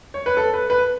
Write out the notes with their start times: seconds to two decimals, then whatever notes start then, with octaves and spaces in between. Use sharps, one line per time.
0.14 C#5
0.26 B4
0.37 A4
0.54 B4
0.70 B4